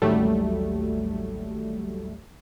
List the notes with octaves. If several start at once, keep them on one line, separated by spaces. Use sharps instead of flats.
A1 D#2 F#3 G3 A3